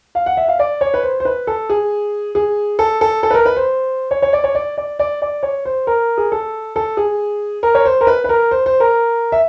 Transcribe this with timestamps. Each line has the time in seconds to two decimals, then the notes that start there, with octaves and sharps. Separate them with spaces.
0.15 F5
0.26 F#5
0.37 E5
0.48 F5
0.59 D5
0.81 C#5
0.94 B4
1.03 C5
1.20 C5
1.25 B4
1.47 A4
1.69 G#4
2.35 G#4
2.79 A4
3.01 A4
3.23 A4
3.30 B4
3.34 A#4
3.46 B4
3.56 C5
4.11 C#5
4.22 C#5
4.33 D5
4.44 C#5
4.55 D5
4.77 D5
4.99 D5
5.22 D5
5.43 C#5
5.65 C5
5.87 A#4
6.18 G#4
6.32 A4
6.76 A4
6.97 G#4
7.63 A#4
7.75 C#5
7.85 C5
8.01 A#4
8.07 B4
8.24 B4
8.29 A#4
8.51 C5
8.66 C5
8.80 A#4
9.32 E5